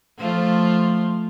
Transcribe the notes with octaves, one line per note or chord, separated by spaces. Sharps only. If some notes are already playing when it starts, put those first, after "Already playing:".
F3 A3 F4